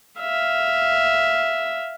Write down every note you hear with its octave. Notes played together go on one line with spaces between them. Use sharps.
E5 F5